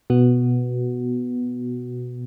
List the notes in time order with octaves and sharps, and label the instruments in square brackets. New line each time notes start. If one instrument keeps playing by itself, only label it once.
[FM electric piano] B2 B3 F#4